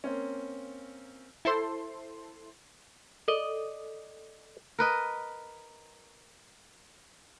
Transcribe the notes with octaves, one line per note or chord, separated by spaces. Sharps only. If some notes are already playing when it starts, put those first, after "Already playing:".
A#3 C4 C#4
E4 A4 C5 C6
A4 D5 D#5
A#4 B4 D#5